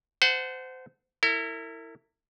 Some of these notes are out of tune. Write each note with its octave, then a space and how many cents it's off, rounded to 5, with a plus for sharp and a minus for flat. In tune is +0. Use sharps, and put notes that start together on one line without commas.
C5 -25 F#5 +0 A5 +0
E4 +0 A#4 -40